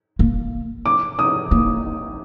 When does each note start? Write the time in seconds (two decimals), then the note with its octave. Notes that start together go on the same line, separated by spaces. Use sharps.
0.19 A#3
0.86 D6
1.19 D#6
1.51 A#3